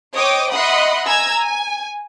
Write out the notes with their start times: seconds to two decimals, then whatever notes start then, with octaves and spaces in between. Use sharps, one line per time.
0.15 C5 C#5 D#5 G5 D6 D#6
0.52 D#5 E5 F#5 B5 C6 D#6
1.08 G#5 A#5 E6 G#6
1.41 G#5